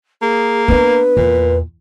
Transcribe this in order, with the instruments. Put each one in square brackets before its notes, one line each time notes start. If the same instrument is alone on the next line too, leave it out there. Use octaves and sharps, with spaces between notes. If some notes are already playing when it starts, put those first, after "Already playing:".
[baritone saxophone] A#3 [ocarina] G#4
[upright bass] B3 D4 [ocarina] B4
[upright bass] E2 [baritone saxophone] A#2